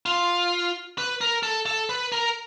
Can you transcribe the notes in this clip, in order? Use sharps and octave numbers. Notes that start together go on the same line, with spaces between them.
F4
B4
A#4
A4
A4
B4
A#4